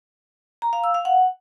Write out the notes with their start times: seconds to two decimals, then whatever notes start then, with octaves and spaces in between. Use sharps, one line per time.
0.62 A#5
0.73 F5
0.84 E6
0.94 F5
1.05 F#5